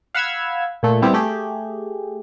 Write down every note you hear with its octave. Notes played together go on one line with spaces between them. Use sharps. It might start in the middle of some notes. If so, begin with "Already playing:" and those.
F5 F#5 B5 E6 F6 G#6
A#2 A3
G3 B3 C4 E4
A3 G4 G#4